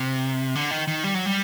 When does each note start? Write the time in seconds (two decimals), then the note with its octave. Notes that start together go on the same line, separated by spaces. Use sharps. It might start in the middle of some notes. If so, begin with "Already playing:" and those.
Already playing: C3
0.55 D3
0.71 D#3
0.88 D#3
1.04 G3
1.14 F#3
1.26 G3